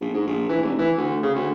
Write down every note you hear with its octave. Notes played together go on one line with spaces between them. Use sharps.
A#1
G#2
A#1
E3
F1
E3
D2
C#3
D2